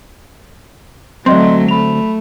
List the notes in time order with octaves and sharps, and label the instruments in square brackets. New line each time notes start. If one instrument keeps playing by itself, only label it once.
[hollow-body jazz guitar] D2 C4 [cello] F#3 A3 [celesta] D5 D#5 C6
[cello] A3 [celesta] B5 F7